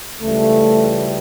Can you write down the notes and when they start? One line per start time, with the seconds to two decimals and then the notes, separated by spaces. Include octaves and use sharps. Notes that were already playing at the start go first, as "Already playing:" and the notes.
0.22 C#2 C#3 E3 G3 A3